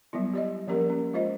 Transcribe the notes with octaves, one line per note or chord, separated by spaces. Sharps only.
F#3 G3 B3 E4
G4 D5 D#5
F3 A#3 C#4 G4 A#4
C#4
G#3 F4 C5 D#5